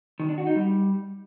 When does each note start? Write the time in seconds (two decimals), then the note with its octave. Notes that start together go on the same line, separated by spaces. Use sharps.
0.20 D#3
0.29 D4
0.38 F#4
0.47 D#4
0.56 G3